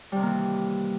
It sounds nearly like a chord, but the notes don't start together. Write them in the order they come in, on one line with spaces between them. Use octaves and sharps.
G3 C3 D#3 A#3 E3